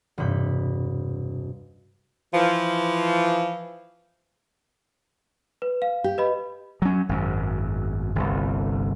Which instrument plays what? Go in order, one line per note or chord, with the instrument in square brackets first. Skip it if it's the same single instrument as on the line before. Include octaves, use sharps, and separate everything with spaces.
[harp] E1 G2 C3 B5 G6
[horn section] E3 F3
[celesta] B4
F5
[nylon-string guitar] G4
[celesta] B4 D#5 B5
[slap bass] F#3 C#4
G#1 F#2
G1 C2